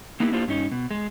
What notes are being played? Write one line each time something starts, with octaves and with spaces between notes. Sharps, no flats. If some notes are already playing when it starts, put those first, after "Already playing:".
A#3 B3 D#4 E4 G4
A#3 D4 E4 F4 G4 C5
G2 C#4 D#4
B2
G#3